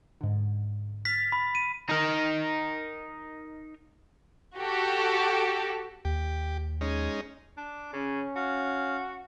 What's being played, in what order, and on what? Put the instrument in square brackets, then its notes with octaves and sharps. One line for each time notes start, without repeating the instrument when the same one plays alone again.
[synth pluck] G#2 D3
[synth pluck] F6 A6 [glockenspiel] B6
[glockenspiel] B5
D#7
[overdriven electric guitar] D#4 A#4
[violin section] F#4 G4 A4
[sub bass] D#2 [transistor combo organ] G4
[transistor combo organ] G#3 C#4 D#4
[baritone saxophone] D4 [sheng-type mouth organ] D6
[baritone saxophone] C#3 [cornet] C#4
[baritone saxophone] F#4 [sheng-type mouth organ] F5